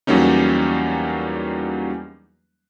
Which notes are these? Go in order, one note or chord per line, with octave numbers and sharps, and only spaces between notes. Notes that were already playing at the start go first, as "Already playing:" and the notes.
E2 F#3 G3 A#3 C#4 D#4